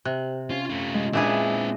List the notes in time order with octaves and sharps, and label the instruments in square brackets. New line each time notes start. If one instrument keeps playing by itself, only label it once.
[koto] C3 [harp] F#6
[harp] C#4 [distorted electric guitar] F4
[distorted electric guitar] A3 F4
[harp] G#3
[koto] A#2 D4 G#4 [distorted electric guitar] C4 B4 [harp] E4 E5